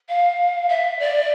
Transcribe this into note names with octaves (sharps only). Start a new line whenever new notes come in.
F5
E5
D5